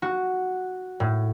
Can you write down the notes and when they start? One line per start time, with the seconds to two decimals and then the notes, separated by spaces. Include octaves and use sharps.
0.02 F#4
1.00 A2